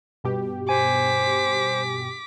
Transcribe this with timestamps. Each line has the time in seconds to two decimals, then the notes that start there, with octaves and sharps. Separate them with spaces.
0.24 G2 B2 G4
0.69 C5 G#5 D6 B6